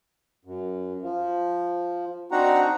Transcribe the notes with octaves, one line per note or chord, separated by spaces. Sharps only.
F#2
F3
C4 D4 D#4 F#4 F#5 A#5